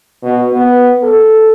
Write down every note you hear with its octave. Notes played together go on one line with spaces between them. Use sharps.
B2
B3
A4